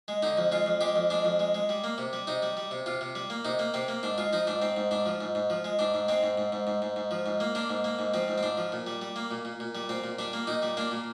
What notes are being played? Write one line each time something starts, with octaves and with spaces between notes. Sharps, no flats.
G#3
D3 D#4
F2
G#3 F4
F2
G#3 G4
F2
G#3 D4
F2
G#3
G#3
G3
A#3
C3
G3
C3 D#4
G3
G3
C3
C3 F4
C3
G3
A#3
C3 D#4
A#3
C3 C4
A#3
G#2 D4
G#3 F4
F3 D#4
G#2 D4
G#2 C4
G#2
G#2 D4
F3
G#2
G#2
F3
G#3
G#2 D4
G#2
G#3 C4
G#2
G#2
G#2
G#2
G#2
G#2
F3
G#2
A#3
A#3 D4
G#2
A#3
G#2
F3 C4
G#2
C4
G#2 D4
F3
A#2
G3
G3
A#3
A#2
A#2
A#2
G3
A#2 C4
A#2
G3 D4
A#3
A#2 D#4
G3
A#3 D4
A#2